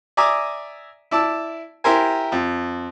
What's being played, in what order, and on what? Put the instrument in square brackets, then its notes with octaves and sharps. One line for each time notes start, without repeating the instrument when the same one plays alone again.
[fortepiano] D5 E5 G#5 A#5 D6 D#6
E4 D5 A5 E6
E4 G4 A#4 C5 G#5
F2